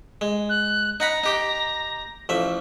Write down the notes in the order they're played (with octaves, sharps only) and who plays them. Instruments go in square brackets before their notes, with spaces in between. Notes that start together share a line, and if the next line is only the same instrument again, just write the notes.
[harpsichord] G#3
[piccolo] F#6
[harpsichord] D#4 F#5 B5 [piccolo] A#5
[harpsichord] D#4 G4 G5
A1 F3 E5